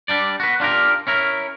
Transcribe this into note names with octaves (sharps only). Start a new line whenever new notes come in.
G3 D4 D5
F#4 B4
D4 F4 G4 A#4
C#4 E4 A#4